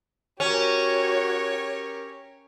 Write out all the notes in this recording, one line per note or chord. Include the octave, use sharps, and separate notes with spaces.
C#4 F#4 G4 A#4 C#5